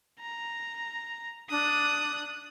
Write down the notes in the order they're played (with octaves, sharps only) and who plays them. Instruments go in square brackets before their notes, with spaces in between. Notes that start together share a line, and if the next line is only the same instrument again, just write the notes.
[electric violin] A#5
[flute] D4 [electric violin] D#6 F#6